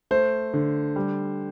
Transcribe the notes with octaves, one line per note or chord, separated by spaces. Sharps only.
A3 C5
D3
G3